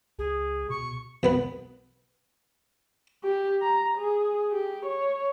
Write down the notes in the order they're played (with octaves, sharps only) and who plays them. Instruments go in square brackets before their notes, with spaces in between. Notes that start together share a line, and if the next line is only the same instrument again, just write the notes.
[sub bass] C#2 [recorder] G#4
[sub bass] B2 [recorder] C#6
[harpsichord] B1 B3 B4
[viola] G4
A#5
G#4
G4
C#5